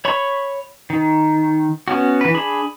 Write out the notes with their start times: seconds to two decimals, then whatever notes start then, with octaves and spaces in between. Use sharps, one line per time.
0.05 C#5 B5 C#6
0.90 D#3
1.88 B3 C#4 F#4
2.21 E3 B4
2.34 D4 G#4 B5